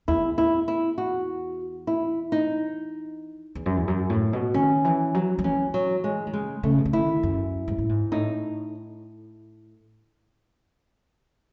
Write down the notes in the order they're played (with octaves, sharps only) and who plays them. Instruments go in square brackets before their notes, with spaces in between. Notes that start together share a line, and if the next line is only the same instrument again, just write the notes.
[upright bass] E2 [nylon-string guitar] E4
[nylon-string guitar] E4
E4
F#4
E4
D#4
[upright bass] E2
F#2
E2
F#2
A2
B2
[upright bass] D#3 [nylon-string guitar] C#4
[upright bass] E3
F#3
F#3
[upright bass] E3 [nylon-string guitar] C#4
[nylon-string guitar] F#3
G#3
[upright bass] D#3
[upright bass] C#3 [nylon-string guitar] G#3
[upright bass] C#3 [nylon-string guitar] A3
[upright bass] B2
C#3
[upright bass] D#3 [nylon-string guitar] E4
[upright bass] F#2
G#2
A2
G#2
[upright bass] A2 [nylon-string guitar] D#4